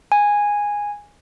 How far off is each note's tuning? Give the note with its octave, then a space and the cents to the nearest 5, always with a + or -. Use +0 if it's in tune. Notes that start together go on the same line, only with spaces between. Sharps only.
G#5 -10